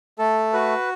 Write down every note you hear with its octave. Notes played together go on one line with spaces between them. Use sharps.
A3 A4
F#4 B4